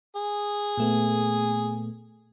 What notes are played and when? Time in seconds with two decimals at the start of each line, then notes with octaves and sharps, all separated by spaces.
0.16 G#4
0.78 A#2 A3 B3